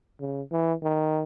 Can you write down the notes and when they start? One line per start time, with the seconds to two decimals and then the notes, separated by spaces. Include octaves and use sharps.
0.20 C#3
0.51 E3
0.83 D#3